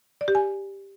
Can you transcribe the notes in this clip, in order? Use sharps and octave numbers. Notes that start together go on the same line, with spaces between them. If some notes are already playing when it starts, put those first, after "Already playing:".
D5
G4
G#5